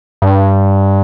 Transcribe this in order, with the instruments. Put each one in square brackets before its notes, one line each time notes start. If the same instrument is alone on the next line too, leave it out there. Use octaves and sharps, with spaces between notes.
[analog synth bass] G2